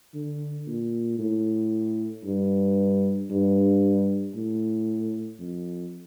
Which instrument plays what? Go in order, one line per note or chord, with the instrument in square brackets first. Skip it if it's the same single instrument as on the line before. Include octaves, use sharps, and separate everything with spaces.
[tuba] D3
A#2
A2
G2
G2
A2
F2